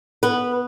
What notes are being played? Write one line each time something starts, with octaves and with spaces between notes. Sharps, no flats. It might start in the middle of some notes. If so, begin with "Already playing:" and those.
B3 B4